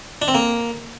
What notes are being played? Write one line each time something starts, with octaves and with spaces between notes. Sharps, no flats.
D4
C4
A#3